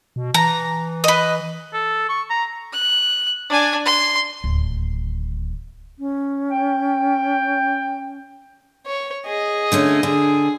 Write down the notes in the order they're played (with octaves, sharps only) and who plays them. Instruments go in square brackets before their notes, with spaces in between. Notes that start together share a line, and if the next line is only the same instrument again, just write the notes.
[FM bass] B2
[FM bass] E3 [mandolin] A#5
[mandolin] B4 D#5
[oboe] A4
C#6
A#5
[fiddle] F#6
D4 G#5
C6
[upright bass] D1 D#2
[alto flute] C#4
[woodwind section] G5
[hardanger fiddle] C#5
G#4 D#5
[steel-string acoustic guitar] D3 A3 C#4
[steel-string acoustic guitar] D3 [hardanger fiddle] G#4